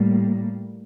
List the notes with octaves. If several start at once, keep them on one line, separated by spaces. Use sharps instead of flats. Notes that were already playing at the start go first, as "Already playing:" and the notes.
Already playing: A2 G3 A#3